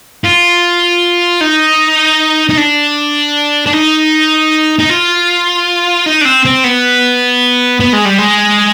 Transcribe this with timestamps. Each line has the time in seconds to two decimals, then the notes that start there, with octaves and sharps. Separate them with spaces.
0.24 F4
1.41 D#4
2.49 D#4
2.57 D4
3.67 D4
3.73 D#4
4.79 D#4
4.89 F4
6.06 D#4
6.21 D4
6.25 C4
6.45 C4
6.64 B3
7.80 B3
7.93 G#3
8.05 G3
8.18 G#3